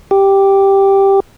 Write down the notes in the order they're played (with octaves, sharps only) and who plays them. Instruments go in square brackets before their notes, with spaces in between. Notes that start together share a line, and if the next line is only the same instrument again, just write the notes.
[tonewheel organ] G4